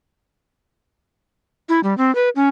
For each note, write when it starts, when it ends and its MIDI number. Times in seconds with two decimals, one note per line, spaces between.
1.69 1.80 64
1.84 1.96 55
1.98 2.14 60
2.15 2.29 71
2.36 2.49 61